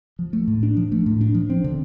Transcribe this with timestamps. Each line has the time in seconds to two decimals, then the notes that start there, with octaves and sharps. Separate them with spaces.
0.19 F3
0.33 A3
0.48 A2
0.63 D4
0.77 F3
0.92 A3
1.06 A2
1.21 D4
1.35 F3
1.50 C4
1.64 D3